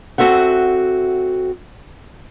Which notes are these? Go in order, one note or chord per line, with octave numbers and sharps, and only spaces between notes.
C4 F#4 A4 E5 F#5